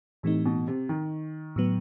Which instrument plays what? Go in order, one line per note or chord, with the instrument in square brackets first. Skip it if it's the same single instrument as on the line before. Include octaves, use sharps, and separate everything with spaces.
[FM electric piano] A2 E3 A3 D#4 [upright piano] C3
[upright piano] B2
C3
D#3
[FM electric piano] A2 F#3 B3